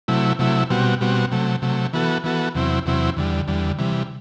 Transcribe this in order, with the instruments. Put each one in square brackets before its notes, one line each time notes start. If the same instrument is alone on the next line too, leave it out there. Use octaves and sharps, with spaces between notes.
[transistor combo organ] C3 F#3 A3 E4
C3 F#3 A3 E4
B2 G3 C4 F#4
B2 G3 C4 F#4
C3 F#3 A3
C3 F#3 A3
E3 B3 F#4 A4
E3 B3 F#4 A4
E2 C3 F#3 C4 E4
E2 C3 F#3 C4 E4
E2 D3 G3
E2 D3 G3
C3 E3 G3